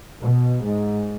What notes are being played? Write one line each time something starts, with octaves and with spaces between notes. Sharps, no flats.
B2
G#2